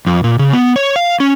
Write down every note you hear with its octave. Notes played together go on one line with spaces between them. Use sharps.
F2
A#2
C#3
B3
C#5
F5
C#4